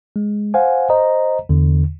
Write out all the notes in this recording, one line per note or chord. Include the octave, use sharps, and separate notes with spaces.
G#3
C5 F5 F#5 G#5
C5 D#5 A#5
E2 D3